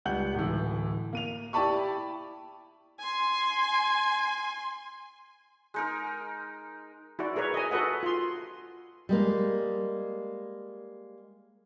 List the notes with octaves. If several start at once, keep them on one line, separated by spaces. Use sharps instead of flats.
C#2 G3 F#5 G6 F#7
D1 E3
A#3 D#7 F7
E4 G4 D5 A5 B5 C#6
G#5 C6
G#3 D#4 A#4
E4 F#4 D5
G#4 A#4 B4 C#5
D#5 G#5
F#4 A4 B4 D#5 F#5
F4 C6
G3 G#3 A#3